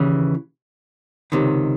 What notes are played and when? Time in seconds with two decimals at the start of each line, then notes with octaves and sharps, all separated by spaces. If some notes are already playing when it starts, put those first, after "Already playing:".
Already playing: D#2 C#3 E3
1.32 C#2 C3 D#3